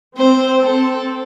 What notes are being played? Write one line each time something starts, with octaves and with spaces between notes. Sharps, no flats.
C4 C5
C4 A4